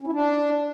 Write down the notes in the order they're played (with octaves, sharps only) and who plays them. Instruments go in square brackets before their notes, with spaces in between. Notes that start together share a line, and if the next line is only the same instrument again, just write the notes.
[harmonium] C#4
E4
D4